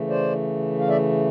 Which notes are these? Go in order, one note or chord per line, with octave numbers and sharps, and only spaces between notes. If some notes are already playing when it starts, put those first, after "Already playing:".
Already playing: C#3 E3 A3
C5 D5
F5
D5 E5